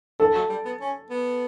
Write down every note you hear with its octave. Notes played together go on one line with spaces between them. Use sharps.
E3 A4
F#3
G3
B3
C#4
B3